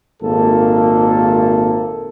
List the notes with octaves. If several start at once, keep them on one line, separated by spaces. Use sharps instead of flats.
G#1 A#2 A#3 A4